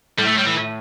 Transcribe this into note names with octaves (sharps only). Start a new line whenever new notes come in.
A2 G3
A3
G3
E3